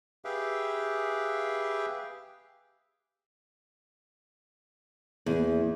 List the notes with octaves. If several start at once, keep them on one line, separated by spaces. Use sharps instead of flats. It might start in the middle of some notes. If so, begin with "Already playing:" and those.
G4 G#4 B4 E5 F5 G5
E2 A#3 G#4